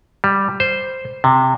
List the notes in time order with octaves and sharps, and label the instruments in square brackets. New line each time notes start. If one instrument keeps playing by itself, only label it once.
[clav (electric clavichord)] G3
C5
C3